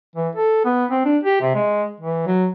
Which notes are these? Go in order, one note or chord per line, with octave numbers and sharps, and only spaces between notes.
E3
A4
B3
C4
D4
G4
C3
G#3
E3
F#3